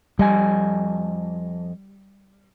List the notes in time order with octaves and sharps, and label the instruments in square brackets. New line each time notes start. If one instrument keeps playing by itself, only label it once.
[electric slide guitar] F2 D#5 G#5 [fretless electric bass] G3